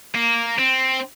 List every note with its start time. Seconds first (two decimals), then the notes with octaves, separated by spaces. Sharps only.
0.15 A#3
0.59 C4